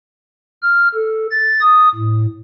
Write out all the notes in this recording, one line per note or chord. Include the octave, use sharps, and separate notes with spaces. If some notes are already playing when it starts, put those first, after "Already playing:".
F6
A4
A6
D#6
A2